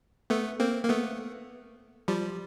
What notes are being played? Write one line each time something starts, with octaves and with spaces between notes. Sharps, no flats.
A3 B3
A#3 C4
A#3
A3 B3
F3 G3